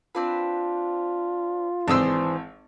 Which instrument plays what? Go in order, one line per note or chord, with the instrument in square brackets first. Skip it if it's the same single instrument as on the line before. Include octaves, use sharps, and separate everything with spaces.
[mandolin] C4 D4 B4 [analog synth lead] F4
[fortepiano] G#1 E6 [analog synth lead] E3 [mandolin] D4 G#4 C5